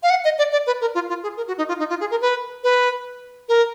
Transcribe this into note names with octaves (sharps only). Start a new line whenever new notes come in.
F5
F#5
D#5
D5
D5
B4
A#4
F4
F4
G#4
A#4
F#4
D#4
F4
D#4
F4
G#4
A#4
B4
B4
A#4